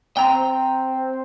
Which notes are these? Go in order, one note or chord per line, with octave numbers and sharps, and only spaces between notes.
C4 G5 A#5